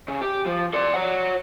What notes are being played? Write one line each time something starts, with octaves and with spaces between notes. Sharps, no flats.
C#3
G4
F3
D5 C6
C#5 F#5